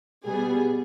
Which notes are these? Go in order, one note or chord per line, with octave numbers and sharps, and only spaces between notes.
B2 G3 B3 G#4